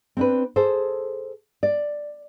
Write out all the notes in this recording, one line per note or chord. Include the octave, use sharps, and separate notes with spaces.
C4 D4 B4
G#4 A4 C5
D5